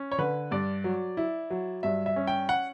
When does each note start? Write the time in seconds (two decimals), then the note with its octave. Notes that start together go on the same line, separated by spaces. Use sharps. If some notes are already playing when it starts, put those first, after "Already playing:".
Already playing: C#4
0.12 C#5
0.18 D3 B4
0.51 G2 D5
0.84 F#3
1.17 E4
1.50 F#3
1.83 G2 E5
2.06 E5
2.16 C#4
2.27 G5
2.49 F#5